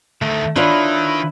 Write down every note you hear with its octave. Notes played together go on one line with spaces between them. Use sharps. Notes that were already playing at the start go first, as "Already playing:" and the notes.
D2 D#3 A3
D#3 D4 E4 F4 B4 C#5